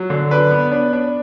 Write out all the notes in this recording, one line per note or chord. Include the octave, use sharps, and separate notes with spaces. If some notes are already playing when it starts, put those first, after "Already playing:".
Already playing: F#3
D3
D4 B4
B3
D4
D4